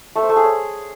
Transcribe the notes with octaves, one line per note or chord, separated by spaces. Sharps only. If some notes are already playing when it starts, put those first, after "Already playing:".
A3
C5
A3
G#4
C#5